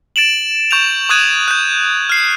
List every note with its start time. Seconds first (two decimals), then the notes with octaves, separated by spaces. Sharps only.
0.16 A6 D7 E7 F#7
0.71 C#6 G6 E7 F7
1.09 C#6 D#6 F#6 G#6 D#7
1.48 F#6 G6
2.09 F6 C7